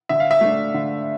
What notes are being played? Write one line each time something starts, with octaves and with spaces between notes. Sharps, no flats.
D3 E5
F5
E5
A3 D4
D3